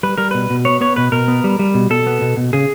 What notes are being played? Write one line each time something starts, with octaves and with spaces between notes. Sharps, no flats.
G3 B4
G3 A#4
B2 B4
B2
B3 C#5
B3 C#5
B2 B4
B2 A#4
B3
G3
G3
B2
B2 A4
B3
B2
B2
C#3 G#4